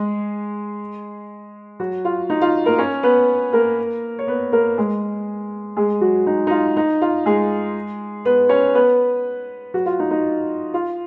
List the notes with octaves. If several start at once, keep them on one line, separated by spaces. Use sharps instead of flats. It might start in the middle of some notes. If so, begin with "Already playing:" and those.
Already playing: G#3 G#4
F#3 F#4
F4
D#4
F4
A#3 A#4
C#4 C#5
B3 B4
A#3 A#4
C#5
B3 B4
A#3 A#4
G#3 G#4
G#3 G#4
F#3 F#4
D#4
D#4
F4
D#4
F4
G#3 G#4
B3 B4
C#4 C#5
B3 B4
F#3 F#4
F4
D#4
D#4
F4